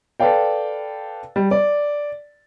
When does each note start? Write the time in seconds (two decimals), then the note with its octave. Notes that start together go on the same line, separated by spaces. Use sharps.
0.20 A4 B4 D5 F5 G5
1.36 G3
1.51 D5